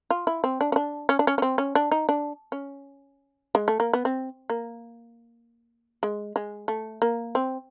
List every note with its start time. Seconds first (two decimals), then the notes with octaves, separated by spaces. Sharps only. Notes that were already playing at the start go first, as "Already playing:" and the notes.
0.11 F4
0.27 E4
0.44 C4
0.61 D4
0.72 C#4
0.76 D4
1.09 C#4
1.19 D4
1.27 C#4
1.38 C#4
1.42 C4
1.58 C#4
1.75 D4
1.92 D#4
2.09 D4
2.52 C#4
3.55 G#3
3.68 A3
3.80 A#3
3.93 B3
4.05 C4
4.50 A#3
6.03 G#3
6.36 G#3
6.68 A3
7.02 A#3
7.35 C4